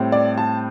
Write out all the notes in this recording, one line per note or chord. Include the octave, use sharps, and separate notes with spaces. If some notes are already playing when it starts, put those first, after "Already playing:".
Already playing: A2 G3 C4
D5
A5